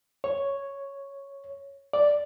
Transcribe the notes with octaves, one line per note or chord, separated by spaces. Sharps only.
C#5
D5